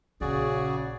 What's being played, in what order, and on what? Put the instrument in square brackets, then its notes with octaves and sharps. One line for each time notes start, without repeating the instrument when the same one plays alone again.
[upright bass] A#1 [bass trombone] C#3 [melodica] F#4 G#4 D5